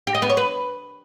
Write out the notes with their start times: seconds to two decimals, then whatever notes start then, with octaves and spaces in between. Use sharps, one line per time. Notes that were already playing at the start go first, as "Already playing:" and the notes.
0.07 G4
0.15 D#5
0.22 B3
0.30 C#5
0.37 B4